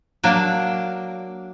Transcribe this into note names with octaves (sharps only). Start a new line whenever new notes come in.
F#3 A#3 D4